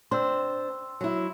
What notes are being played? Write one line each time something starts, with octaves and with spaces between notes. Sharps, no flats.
C4 D4 C5 C6 E6
F#3 E4